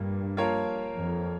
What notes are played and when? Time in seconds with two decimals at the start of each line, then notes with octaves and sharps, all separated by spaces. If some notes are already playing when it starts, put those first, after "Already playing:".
Already playing: G2 A#2 A#3
0.37 F3 A#3 F4 A#4 C#5
0.95 F2